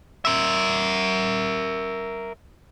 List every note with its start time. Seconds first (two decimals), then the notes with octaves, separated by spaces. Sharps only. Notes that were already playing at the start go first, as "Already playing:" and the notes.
0.25 A#4 E5